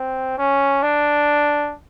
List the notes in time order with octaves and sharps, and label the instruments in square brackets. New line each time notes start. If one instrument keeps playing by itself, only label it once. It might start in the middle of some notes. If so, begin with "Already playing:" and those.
Already playing: [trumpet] C4
C#4
D4